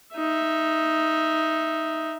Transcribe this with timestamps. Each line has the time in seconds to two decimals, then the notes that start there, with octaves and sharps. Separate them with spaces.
0.16 D#4 E5